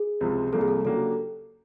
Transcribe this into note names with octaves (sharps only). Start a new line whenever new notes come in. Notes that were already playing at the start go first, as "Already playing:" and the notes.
Already playing: G#4
C#2 C3 F3 G#3
C2 C3 F3 A#3 A4
G#4
A4
C#3 F#3 A#3 D4 G4 A4